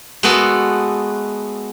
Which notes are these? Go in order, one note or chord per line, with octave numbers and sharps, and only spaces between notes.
G#3 A3 B3 F#4 A4